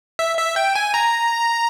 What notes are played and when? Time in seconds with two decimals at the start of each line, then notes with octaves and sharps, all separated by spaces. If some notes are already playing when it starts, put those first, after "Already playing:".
0.19 E5
0.37 E5
0.56 G5
0.75 G#5
0.94 A#5